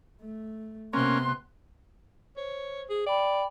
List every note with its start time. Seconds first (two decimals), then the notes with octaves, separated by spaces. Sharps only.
0.21 A3
0.93 C3 A#3 B3 C#4 C6 F#6
2.37 C5 C#5
2.90 G#4
3.06 D5 G5 B5